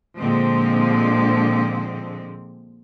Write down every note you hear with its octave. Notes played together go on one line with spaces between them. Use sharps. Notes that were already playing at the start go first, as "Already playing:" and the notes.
A#2 D3 F3 G#3 C4